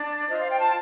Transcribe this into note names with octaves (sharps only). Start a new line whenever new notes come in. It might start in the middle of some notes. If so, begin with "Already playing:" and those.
Already playing: D4
F4 C5 D#5
F5
G5
A5